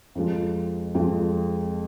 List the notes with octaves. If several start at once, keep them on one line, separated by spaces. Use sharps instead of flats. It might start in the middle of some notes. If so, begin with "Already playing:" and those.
F2 F3 G#3
F2 F3 G#3